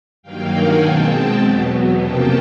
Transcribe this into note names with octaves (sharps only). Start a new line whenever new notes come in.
G2 D#3 F#3 A#3 F5 G5
F#5 G#5
B2 G#3 C4 G5 A5
E2 B2 F#3 B3
F2 C3 F3 A#3 C#4 G5 A5